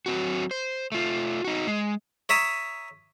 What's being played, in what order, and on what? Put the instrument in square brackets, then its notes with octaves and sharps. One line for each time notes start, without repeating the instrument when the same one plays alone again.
[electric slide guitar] F#3 C4 F#4
C5
A3 F4
D#4 F#4
G#3
[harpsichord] C#5 E5 A#5 D#6